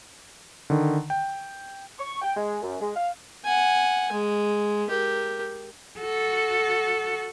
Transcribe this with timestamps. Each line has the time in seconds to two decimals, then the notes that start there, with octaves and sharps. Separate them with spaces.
0.70 D3 D#3
1.10 G5
1.99 C#6
2.22 G5
2.37 G#3
2.62 F#2
2.81 G#3
2.96 F5
3.44 F#5 G#5
4.12 G#3
4.87 G4 A#4
5.99 F#4 A4